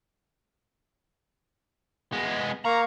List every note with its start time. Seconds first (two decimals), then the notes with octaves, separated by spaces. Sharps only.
2.12 G#3 B3
2.65 A#3 F5 A#5 C#6